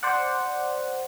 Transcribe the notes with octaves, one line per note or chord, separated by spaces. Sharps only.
C5 D5 F#5